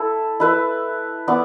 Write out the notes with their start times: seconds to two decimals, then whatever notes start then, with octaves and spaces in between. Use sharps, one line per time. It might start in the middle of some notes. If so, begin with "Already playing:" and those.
Already playing: E4 A4
0.40 E4 B4 E5
1.28 B3 E4 D5